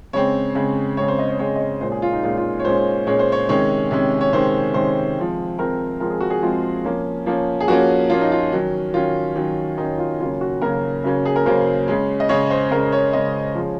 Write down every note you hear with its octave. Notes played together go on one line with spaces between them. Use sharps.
C#3 G#3 C4 C#5
C#3 G#3 C4
C#3 G#3 C4 C#5
C5
D#5
C#5
C#3 G#3 C4 C#5
D#5
C#5
A#2 G#3 C#4 C5
G#4
F4
D#4
A#2 G#3 C#4 F4
F4
C#5
A#2 G#3 C#4 C5
A#2 G#3 C#4 C#5
C5
C#5
C3 D#3 G#3 C#4 C#5
C3 D#3 G#3 C#4
C#5
C3 D#3 G#3 C#4 C5
C3 D#3 G#3 C#4 C5
F3 G#3 C4
F3 G#3 C4 A#4
F3 G#3 C4 A#4
G#4
F#4
G#4
F3 G#3 C4 F4
F3 A#3 C#4
F3 A#3 C#4
G#4
F3 A#3 C#4 F#4
F3 A#3 C#4 F4
D#4
F4
D#3 F#3 C#4
D#3 F#3 C#4 F4
D#3 F#3 C#4
D#3 F#3 C#4 D#4
F4
C#3 F#3 A#3 C#4 F4
F#4
C#3 F#3 A#3 C#4 A#4
C#3 F#3 A#3 C#4
G#4
A#4
C#3 F#3 A#3 C#4 C5
C#3 G#3 C#4
D#5
C#3 G#3 C#4 C#5
C5
C#3 G#3 C#4 A#4
C#5
C#3 G#3 C#4 D#5
F3 G#3 C#4